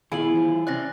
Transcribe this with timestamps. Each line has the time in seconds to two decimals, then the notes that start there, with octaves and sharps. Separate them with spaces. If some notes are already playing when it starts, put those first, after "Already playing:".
0.12 D#3 B3 E4 F4 G#4 G#5 F#7
0.34 E3 C5
0.67 C3 C4 C#4 D5 F#6 A#6